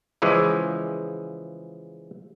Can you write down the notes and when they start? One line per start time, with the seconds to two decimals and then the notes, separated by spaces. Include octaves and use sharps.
0.22 C#3 E3 F3 G#3